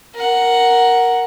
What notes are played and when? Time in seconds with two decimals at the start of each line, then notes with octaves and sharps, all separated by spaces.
0.15 A#4 F#5